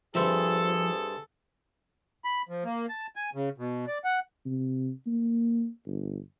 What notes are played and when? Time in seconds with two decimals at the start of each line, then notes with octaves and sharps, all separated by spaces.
0.15 G2 F3 C4 G#4 A4 E5
2.25 B5
2.49 F3
2.64 A#3
2.89 A5
3.16 G#5
3.35 C#3
3.58 B2
3.88 D5
4.04 F#5
4.46 C3
5.06 A#3
5.86 G1